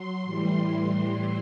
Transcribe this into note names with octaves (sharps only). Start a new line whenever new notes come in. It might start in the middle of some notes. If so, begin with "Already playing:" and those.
Already playing: F#3 C6
A2 E3 G3 C6